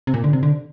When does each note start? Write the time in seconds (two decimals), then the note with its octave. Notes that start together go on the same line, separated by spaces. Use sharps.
0.07 C3
0.14 A#2
0.24 D3
0.33 C3
0.43 D3